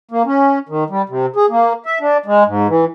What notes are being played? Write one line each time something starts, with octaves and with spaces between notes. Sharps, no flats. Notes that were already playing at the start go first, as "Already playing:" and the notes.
A#3
C#4
D#3
G3
C3
G#4
A#3
E5
D4
G#3
G#2
E3